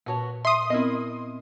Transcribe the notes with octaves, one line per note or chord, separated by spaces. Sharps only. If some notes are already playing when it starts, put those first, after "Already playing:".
A#2 B3 F#4 C#5 A5
E5 C6 D#6
B3 C4 E4 A#4 D#5